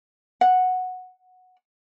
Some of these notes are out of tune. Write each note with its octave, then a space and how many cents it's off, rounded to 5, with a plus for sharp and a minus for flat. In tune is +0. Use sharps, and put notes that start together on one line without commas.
F#5 -5